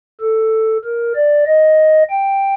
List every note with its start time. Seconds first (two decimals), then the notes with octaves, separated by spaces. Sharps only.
0.21 A4
0.84 A#4
1.15 D5
1.47 D#5
2.10 G5